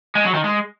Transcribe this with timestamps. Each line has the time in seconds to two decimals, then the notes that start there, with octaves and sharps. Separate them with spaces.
0.15 G#3
0.25 F#3
0.34 D#3
0.44 G#3